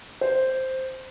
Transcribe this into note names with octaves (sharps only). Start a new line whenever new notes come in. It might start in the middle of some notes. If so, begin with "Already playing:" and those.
C5